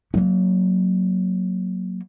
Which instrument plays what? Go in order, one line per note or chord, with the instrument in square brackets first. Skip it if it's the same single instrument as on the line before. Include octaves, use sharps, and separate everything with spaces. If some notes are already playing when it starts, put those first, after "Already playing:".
[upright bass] F#3 A#3